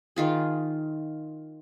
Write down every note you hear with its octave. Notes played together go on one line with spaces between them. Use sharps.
D#3 F4 G#4